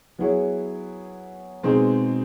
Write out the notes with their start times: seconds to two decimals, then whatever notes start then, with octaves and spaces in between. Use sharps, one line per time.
0.19 F#3 B3 E4 G#4 C#5
1.64 B2 G#3 C4 D#4 G#4